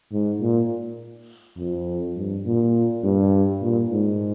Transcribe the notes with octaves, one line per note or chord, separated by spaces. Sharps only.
G#2
A#2
F2
G2
A#2
G2
A#2
G#2